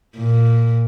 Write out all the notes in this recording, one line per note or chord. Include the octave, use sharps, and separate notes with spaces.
A#2